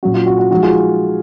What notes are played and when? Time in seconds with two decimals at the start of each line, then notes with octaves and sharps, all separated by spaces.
0.03 A#2 F#3 C#4 F#4
0.14 F4
0.26 F#4
0.39 F#4
0.50 F3 G#3 D#4 F#4
0.63 F4 G#4